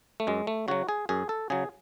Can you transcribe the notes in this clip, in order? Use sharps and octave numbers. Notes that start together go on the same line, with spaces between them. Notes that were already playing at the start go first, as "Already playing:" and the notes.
A3
F#2 G#3
A3
C#3 F#3 F#4
G#4
F#2 G#4
A4
C#3 F#3 G#4